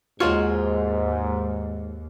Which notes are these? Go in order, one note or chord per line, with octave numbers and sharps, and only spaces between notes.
D#2 G#2 G#3 F4 F#4 C#5